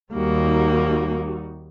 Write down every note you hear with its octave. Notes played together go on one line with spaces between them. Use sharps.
D#2 G3 A#3 D#4 F#4